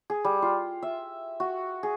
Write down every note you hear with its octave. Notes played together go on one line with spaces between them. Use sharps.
G#4
G3
F4
E5
F#4
G#4